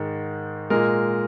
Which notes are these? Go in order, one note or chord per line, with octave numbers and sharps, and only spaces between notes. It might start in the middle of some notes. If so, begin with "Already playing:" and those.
Already playing: G#2 D#3 G#3
A#2 G#3 A#4